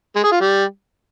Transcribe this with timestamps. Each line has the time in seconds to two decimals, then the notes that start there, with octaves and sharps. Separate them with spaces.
0.16 G#3
0.24 G#4
0.32 F4
0.40 G3